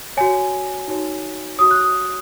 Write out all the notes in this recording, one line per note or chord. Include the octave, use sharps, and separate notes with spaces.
F#4 C#5 G#5
D#4 F#4 C#5
F#4 C#5 D#6
F#6
D#6